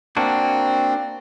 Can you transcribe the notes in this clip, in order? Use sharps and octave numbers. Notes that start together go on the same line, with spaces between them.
A#3 C4 D4 F#4